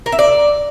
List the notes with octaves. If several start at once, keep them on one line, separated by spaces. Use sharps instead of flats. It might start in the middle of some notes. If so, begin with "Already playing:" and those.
A#4
E5
D5